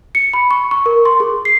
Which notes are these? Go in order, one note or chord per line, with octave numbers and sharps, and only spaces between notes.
C#7
B5
C#6
C#6
A#4
C6
G#4
C7